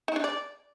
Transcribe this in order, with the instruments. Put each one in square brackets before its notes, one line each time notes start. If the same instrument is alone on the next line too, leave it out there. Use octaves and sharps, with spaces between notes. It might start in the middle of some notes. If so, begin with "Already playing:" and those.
[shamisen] D#4
D4
D5